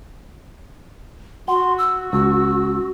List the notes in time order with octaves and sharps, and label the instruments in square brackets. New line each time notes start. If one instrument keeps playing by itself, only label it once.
[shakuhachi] F#4 [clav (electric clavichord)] F#5 [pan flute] C6
[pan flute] E6
[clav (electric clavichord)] C#2 [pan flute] E6